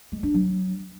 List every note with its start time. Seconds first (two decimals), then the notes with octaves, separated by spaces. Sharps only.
0.12 G#3
0.23 D4
0.34 F#3